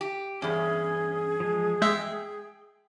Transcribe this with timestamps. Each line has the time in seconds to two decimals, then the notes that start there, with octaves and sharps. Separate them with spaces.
0.01 G4
0.42 E2 G2 C#4 G#4
1.40 F3 G#3
1.82 G#3 E5 G5 G6